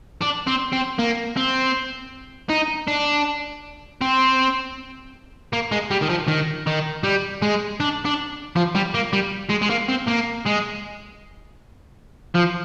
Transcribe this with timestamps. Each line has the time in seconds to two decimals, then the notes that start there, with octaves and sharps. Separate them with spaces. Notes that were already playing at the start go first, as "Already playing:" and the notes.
0.22 D4
0.47 C4
0.72 C4
0.99 A#3
1.36 C4
2.50 D#4
2.87 D4
4.02 C4
5.53 A#3
5.72 G#3
5.91 G3
6.02 D#3
6.10 F3
6.28 D#3
6.67 D#3
7.04 G3
7.42 G#3
7.80 D4
8.06 D4
8.56 F3
8.75 G3
8.94 A#3
9.13 G3
9.50 G#3
9.62 G#3
9.70 A#3
9.89 C4
10.07 A#3
10.46 G#3
12.35 F3